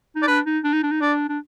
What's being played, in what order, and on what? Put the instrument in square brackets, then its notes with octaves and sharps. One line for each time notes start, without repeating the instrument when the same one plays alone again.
[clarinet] D#4
[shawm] D5
[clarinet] D4 [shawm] B4
[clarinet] D#4
D4
D#4
D4
D#4
[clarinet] D4 [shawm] D5
[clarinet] D4